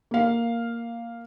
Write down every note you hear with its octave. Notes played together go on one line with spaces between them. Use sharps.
A#3 F5